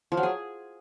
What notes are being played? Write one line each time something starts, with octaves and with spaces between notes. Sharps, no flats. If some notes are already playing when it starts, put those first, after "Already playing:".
F3
F#3
G#4